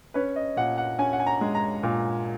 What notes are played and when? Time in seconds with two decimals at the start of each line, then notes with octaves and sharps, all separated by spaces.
0.14 C#4 B4
0.36 D#5
0.57 A#2 F#5
0.78 F#5
0.99 C#4 G#5
1.13 F#5
1.20 G#5
1.27 A#5
1.41 G#3
1.55 A#5
1.83 A#2